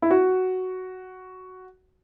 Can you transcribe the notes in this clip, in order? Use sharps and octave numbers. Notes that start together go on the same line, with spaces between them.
E4
F#4